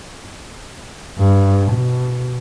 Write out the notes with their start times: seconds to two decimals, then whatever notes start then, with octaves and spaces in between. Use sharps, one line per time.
1.18 G2
1.72 B2